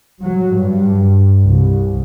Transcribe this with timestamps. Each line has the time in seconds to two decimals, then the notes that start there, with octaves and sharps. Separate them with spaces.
0.23 F#3
0.55 G2
1.43 C2